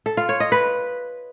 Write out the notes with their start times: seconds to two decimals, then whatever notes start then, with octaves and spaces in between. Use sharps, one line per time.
0.06 A4
0.17 F4
0.29 C#5
0.40 D#5
0.52 B4